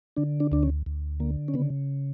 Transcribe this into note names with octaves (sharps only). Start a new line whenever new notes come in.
D3 D4
D4
D2 D4
C#4
D2
D3 A#3
C#4
C#3 B3